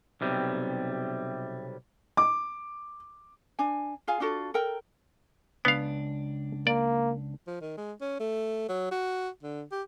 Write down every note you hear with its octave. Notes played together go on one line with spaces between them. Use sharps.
B1 C3 G3
D6
D4 G#5
F4 G#4 F5 G#5
D4 F4 F#4 A4
A4 A#4 G5
C#2 B3 D4 F5
A#3 D5
F3
D#3
G#3
C#4
A3
F#3
F#4
D3
G4